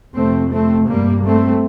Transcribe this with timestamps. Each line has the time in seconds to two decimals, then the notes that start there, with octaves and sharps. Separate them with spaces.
0.15 F2 C3 A3 C4
0.52 A3 C4
0.88 G2 G3 A#3
1.24 A3 C4